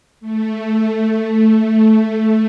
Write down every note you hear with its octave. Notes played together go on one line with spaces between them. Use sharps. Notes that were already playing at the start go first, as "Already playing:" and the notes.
A3
A3